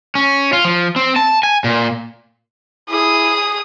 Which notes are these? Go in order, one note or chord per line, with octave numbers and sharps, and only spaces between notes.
C#4
F4
F3
C4
A5
G#5
A#2
E4 G#4 D#6